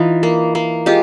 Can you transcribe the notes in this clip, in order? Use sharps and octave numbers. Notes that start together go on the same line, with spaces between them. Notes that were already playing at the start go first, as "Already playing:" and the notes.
Already playing: E3 D#4 F4
A#3
A#3
G#3 F4 G4